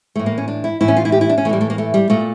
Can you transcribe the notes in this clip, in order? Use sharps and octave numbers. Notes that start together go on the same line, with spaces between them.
A2 E3 A3
A#3
C#4
D4
E4
A2 E3 E4
C#4
F4
E4
G4
E4
D4
C#4
A2 E3 G3 A3
A3
A#3
A3
G3
A#2 A3